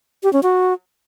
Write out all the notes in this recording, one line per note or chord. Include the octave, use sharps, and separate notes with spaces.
G4
C#4
F#4